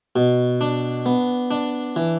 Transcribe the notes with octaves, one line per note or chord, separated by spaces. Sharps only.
B2
D4
B3
D4
E3